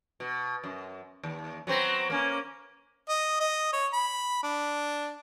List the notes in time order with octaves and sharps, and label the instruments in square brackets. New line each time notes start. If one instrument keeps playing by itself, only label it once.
[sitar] B2
F#2
D#2
F#3 B3 C4
A#3 C#4
[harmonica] D#5
D#5
C#5
B5
D4